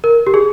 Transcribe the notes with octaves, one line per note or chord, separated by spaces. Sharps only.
A#4
G4
G#4